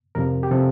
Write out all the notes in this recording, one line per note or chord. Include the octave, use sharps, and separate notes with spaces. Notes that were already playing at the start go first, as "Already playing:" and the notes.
F2 C3 F3 A#4
G4
C3 F3 A4